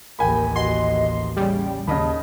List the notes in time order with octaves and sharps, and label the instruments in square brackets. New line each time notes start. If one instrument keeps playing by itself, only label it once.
[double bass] A1 D#2 [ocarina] A#4 [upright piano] G5 G#5 B5
[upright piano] F#4 [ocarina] D#5 [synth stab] C6
[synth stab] C#3 G3 [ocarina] G5
[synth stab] D#2 [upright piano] C#3 D#5 B5 [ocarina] A5